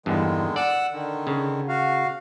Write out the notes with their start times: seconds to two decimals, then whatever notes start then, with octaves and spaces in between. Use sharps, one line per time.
0.06 E2 G2 D3 D#3 G#3
0.56 D5 F#5 E6
0.92 D3 D#3
1.27 C#3
1.68 F#4 F5